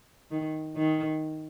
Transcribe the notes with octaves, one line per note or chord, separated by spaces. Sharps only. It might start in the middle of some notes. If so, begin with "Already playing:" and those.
D#3
D#3